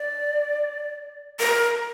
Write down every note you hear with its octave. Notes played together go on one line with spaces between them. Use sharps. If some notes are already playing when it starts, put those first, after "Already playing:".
Already playing: D5
A#4